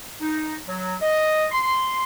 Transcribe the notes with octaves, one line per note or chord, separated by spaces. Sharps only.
D#4
F#3
D#5
C6